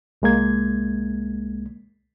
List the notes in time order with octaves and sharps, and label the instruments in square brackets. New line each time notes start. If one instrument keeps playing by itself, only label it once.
[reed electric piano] C2 G#3 A#3 G#6